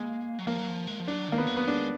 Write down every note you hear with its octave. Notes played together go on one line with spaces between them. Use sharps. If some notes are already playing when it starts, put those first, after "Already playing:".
Already playing: G#3 A#3
F#3
F3 A#3
F#3
F3
G#3
F3
F#3 D4
D#3 A#3
B3
F#3
B3
G#3 D4